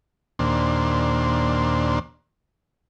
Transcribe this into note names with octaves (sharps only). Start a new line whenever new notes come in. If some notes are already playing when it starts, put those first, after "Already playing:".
D#2 A#2 D4 C5